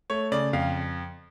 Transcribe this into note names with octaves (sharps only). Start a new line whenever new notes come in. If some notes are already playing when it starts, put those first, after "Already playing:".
A3 C#5
C#3 D5
F2 F5